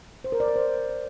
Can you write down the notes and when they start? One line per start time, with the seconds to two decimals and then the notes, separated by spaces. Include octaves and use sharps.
0.24 C5
0.32 A#4
0.40 D5
0.48 A#4
0.56 C5